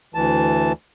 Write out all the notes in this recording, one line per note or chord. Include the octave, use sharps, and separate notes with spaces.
D2 E3 A5